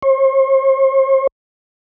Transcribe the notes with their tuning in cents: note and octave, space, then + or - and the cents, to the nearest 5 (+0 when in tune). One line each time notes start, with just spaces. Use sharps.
C5 +45